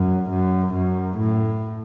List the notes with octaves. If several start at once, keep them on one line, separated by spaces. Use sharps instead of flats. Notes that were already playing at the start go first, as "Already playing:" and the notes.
Already playing: F#2
F#2
F#2
A2